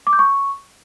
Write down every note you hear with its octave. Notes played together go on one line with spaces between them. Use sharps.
D6
G6
C#6